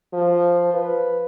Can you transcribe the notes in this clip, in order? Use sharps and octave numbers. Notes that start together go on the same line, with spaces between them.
F3
B4